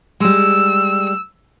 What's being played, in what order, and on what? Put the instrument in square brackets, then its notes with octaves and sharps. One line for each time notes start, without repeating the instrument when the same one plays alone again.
[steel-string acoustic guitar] G3 G#3 [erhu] E6